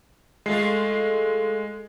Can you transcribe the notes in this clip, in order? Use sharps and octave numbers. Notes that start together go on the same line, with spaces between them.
G#3 A3 F4 A4 C7